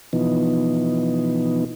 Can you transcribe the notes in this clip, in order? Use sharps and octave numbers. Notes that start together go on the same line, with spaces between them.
B2 E3 F3 B3 D#4